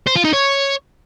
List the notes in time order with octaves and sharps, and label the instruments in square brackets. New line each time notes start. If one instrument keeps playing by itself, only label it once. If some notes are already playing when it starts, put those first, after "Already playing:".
[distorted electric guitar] C5
F4
D#4
C#5